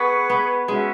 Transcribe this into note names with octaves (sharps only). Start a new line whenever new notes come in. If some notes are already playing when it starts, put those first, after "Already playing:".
Already playing: B3 G#4 B4 F#5 C#6
B3
G#3 C#4 F#4 E5